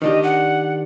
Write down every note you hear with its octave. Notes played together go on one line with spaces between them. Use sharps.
D#3 D4 G4 D#5
F#5